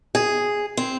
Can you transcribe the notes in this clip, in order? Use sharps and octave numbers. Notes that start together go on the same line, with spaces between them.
G#4
C4